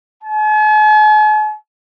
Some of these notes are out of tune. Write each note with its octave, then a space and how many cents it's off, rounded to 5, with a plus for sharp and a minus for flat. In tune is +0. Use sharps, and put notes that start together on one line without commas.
G#5 +45